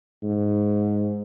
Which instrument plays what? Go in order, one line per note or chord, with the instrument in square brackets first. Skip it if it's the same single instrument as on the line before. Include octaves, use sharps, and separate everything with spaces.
[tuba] G#2